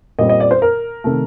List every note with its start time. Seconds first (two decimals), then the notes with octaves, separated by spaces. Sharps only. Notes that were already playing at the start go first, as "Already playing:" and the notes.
0.19 A#2 G3 C4 D#5
0.29 D#5
0.40 D5
0.51 C5
0.62 A#4
1.04 C3 D#3 A3